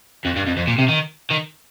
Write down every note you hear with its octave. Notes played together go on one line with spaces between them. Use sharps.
F2
G2
F2
F2
A#2
C3
D#3
D#3